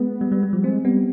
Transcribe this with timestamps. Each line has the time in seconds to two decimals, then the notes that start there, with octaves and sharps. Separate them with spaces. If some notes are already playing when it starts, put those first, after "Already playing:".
Already playing: G#3 B3
0.21 G3
0.32 G3
0.43 G3
0.53 F3
0.63 G#3 C4
0.84 G3 B3